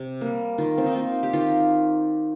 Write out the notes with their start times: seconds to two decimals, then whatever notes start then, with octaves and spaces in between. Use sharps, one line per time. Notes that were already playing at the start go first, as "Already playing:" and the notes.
Already playing: C3
0.21 G3 A#3
0.58 D#3 F4
0.78 C4
0.86 D#4
0.95 A#3 F4
1.23 G4
1.33 D#3 F4